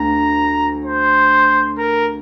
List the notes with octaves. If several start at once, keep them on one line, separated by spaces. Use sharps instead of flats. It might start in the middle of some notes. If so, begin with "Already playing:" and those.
Already playing: D2 A#5
C5
A#4